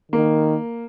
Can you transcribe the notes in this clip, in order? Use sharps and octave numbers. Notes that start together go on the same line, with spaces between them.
D#3 A#3